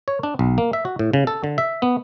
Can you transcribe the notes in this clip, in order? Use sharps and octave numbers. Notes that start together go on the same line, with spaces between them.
C#5
D4
B1
A#3
E5
F#4
A2
C#3
A4
D3
E5
B3